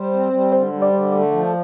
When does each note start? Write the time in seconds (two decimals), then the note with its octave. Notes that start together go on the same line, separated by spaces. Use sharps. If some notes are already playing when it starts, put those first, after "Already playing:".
Already playing: G3 C5
0.13 C4
0.32 G3
0.52 D3 C5
0.73 G3
0.82 D5
0.93 D3
1.12 A3 D5
1.32 F3